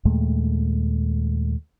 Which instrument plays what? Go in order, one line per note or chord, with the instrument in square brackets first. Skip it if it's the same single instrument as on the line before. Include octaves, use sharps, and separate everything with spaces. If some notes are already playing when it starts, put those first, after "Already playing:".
[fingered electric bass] D#2 A#2 G#3 A3